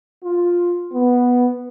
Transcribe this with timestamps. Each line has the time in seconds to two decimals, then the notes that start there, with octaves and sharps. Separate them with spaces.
0.23 F4
0.93 B3